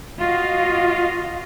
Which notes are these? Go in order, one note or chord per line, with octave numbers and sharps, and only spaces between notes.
F4 F#4 D#5 F5